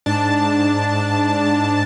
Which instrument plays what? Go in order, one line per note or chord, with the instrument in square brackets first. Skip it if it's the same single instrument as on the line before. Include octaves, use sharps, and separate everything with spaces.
[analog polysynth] G#2 D4 A5